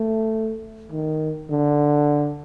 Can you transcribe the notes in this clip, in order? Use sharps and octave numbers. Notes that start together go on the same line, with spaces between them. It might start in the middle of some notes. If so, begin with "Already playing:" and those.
Already playing: A3
D#3
D3